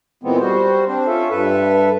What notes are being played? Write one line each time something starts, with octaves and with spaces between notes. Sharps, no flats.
A#2 E3 G#3 B3 C4
G3 F#4 C5
C4 D4 C5
C#4 F4 A4 E5
G2 A4 B4 E5